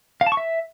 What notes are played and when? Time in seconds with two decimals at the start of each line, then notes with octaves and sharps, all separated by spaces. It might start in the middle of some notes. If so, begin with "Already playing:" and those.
0.21 F5
0.26 A5
0.32 C#6
0.37 E5